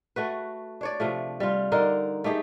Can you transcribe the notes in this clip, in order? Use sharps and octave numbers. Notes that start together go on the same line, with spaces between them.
A3 F#4 B4
D4 C#5 D5
C3 F3 A3
G3 F4
D3 D#4 A#4 D5
A3 D#4 G4 G#4